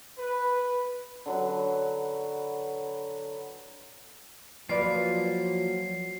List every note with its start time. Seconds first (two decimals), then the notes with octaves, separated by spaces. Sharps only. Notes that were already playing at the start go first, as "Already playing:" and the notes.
0.19 B4
1.26 D3 F#3 B4
4.69 F3 F#3 A#3 F4 B4 D5 C7